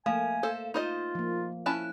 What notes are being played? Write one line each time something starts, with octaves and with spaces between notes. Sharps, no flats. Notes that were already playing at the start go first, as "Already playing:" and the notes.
F3 A3 A#3 F5 G#5
A4 C5
D#4 F4 C5 D#5
F3 A#3
C#4 E4 A5 F#6